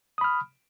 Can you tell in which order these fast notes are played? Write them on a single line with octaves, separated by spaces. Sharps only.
D#6 B5 F6